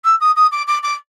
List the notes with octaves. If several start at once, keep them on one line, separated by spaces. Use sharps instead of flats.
E6
D#6
D#6
D6
D6
D6